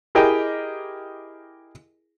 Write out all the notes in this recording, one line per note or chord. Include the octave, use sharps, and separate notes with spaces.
E4 G4 G#4 A#4 D#5 G5